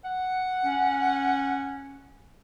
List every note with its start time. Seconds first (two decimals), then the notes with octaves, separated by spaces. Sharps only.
0.05 F#5
0.65 C#4